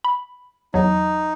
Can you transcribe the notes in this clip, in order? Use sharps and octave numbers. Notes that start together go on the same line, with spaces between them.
B5
E2 F#3 D#4